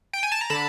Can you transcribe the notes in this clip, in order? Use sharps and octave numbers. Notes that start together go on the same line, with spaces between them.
G5
G#5
A5
A#5
D3 A5 B5